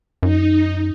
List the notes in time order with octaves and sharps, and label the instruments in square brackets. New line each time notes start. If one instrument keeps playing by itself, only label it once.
[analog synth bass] F#2 [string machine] D#4